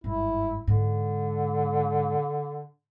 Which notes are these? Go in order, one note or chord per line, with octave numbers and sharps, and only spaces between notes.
G1 G#2 E4
G#2 D3